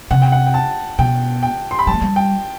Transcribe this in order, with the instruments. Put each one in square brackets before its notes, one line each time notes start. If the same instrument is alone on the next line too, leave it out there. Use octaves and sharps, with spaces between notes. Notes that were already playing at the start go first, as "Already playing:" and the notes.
[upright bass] C3 [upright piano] F#5
[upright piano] G5
F#5
G5
A5
[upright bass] B2 [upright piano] G5
[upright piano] G5
C6
B5
[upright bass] G3 [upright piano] A5
[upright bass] A3
G3
[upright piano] G5